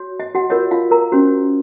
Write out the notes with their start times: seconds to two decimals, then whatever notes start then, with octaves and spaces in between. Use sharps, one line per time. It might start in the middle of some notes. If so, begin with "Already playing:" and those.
Already playing: F#4 C#5
0.20 D#5
0.35 F#4 F#5
0.50 F4 A#4 C#5 D#5
0.71 F4 F5
0.91 A#4 A#5
1.12 C#4 F#4 C5